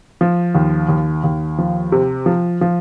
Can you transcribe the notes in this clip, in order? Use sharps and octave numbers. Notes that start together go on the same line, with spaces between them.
F3
D#2
D#2
D#2
F3
C3
F3
F3